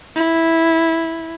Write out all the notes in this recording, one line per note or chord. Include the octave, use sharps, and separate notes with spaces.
E4